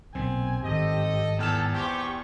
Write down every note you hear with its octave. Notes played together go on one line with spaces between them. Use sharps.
B1 A#2 C4 G#5
G#1 G2 D#3 G4 A4 D#5
E2 A4 G5 A5 F6 E7
C4 F4 G4 G5 C#6